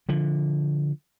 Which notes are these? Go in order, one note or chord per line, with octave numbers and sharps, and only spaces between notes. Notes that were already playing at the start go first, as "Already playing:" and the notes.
D3 F3